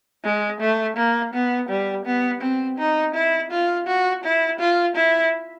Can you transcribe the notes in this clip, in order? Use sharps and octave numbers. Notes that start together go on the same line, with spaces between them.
G#3
A3
A#3
B3
G3
B3
C4
D#4
E4
F4
F#4
E4
F4
E4